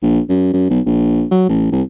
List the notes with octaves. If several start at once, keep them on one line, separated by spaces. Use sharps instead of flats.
A#1
F#2
F#2
B1
A#1
F#3
A1
C2